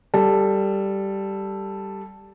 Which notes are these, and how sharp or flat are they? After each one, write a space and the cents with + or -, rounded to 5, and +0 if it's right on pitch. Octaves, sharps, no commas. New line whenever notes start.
G3 +0 A4 +0